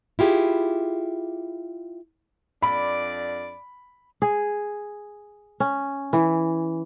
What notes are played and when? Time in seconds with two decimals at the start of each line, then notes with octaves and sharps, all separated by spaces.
0.19 E4 F4 G4 G#4
2.62 F2 D4 D5 B5
4.22 G#4
5.60 C#4
6.13 E3